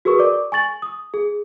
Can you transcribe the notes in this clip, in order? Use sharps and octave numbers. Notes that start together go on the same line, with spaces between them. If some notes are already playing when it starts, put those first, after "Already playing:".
F#4 G#4 A#4 B4 C#6
A#4 D5 D6
G#5 C#6 A6 F#7
D#6
G#4